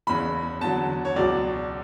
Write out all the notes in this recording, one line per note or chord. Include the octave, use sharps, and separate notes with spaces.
F#1 E2 C#3 B5
E2 D3 F#3 A5
C#5
C#2 B2 F#3 D5